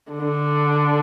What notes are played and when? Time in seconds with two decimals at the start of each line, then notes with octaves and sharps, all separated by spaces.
0.12 D3